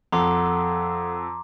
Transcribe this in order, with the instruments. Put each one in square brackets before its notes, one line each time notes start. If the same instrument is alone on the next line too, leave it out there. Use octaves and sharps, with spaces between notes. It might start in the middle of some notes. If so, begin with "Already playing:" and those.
[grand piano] F2 [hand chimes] A4 F#5 [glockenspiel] A#5 C6 D6